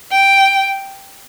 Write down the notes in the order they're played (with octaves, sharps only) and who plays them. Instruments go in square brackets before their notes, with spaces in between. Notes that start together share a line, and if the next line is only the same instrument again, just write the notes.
[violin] G5